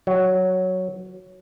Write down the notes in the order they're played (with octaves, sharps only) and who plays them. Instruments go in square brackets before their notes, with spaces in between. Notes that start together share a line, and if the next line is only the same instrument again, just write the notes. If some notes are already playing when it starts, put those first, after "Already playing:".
[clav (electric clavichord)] F#3